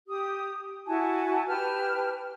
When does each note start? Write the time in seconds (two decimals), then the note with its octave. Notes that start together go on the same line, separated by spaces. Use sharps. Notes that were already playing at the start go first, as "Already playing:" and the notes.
0.08 G4 D#6
0.87 E4 F#4 G#5 A5
1.46 G4 B4 A5 F6